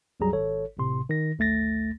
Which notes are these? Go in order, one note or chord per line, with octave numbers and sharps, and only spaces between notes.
C2 F#2 F#3 G3 G#4 A#5
G#1 A4 C#5
G#1 A2 C3 C6
D#3 A#6
G#1 D2 A3 A6 A#6